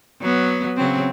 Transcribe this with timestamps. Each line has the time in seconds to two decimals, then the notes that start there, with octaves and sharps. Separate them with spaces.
0.21 F#3 B3
0.76 C#3 F#3 C4